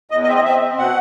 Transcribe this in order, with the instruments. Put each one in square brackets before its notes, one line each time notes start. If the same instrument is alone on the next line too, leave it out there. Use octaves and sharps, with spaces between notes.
[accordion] E2 D#5
D#5
C4 E5
D#5
C4 E5
C4
B2 F#5